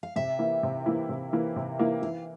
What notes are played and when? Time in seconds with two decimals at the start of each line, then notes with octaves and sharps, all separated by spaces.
0.03 F5
0.16 C3 E5
0.39 E3 A#3 E4
0.63 C3
0.86 E3 A#3 E4
1.09 C3
1.33 E3 A#3 E4
1.56 C3
1.79 E3 A#3 E4
2.02 E3 F5